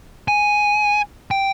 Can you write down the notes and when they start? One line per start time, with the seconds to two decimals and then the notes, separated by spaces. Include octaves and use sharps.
0.28 G#5
1.31 G5